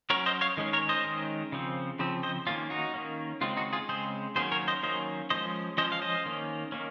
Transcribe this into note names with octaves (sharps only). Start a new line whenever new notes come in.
F#3 C#4 A#4 C#5
C5 D#5
C#5 F5
D#3 G#3 C#4
A#4 C#5
C5 D#5
D#3 G#3 C#4
C#3 F3 C4
C#3 F3 C4
C5 D#5
D#3 A#3 C#4 F4
D#4 F#4
D#3 A#3 C#4
C#3 G#3 C4 F4
D#4 F#4
F4 G#4
C#3 G#3 C4 G#4 C5
D#3 F#3 A#3 C#4 G#4 C5
A#4 C#5
C5 D#5
D#3 F#3 A#3 C#4 C5 D#5
F3 G#3 C#4 C5 D#5
F3 G#3 C#4 C5 D#5
F5
C5 D#5
D#3 A#3 C#4
D#3 A#3 C#4